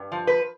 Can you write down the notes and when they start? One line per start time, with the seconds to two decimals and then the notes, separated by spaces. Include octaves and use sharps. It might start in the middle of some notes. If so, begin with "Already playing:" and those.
Already playing: G2
0.12 F3
0.27 B4